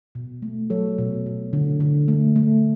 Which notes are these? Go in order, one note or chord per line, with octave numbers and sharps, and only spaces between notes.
B2
A3
F#3 A4 C#5
B2
B2
D3
D3
A3
A3